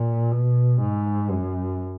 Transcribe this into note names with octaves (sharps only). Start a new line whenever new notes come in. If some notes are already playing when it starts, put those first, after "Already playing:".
Already playing: A#2
B2
G#2
F#2